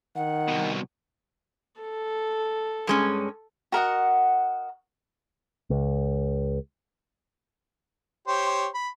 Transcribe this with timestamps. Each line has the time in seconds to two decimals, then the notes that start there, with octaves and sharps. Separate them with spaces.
0.16 D#3 F#5
0.48 C2 B2
1.81 A4
2.87 G2 G#3 C#4
3.72 F#4 A#4 D#5 F#5
5.70 C#2
8.28 G4 C5 C#5
8.74 B5